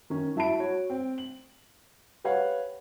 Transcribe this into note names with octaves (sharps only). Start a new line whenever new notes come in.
D#3 C#4
F#3 E4 A5 B5 D7
F#4 C#5
C4
F#7
G4 B4 C#5 F5 F#5